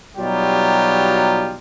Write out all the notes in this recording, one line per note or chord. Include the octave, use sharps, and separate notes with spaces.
B2 F#3 G3 D#4 F4 G4